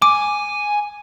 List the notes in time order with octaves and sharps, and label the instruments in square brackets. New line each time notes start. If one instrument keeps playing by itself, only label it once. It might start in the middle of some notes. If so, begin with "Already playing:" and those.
[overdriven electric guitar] G#5 [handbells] D6